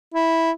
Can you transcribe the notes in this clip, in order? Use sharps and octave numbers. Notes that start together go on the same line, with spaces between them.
E4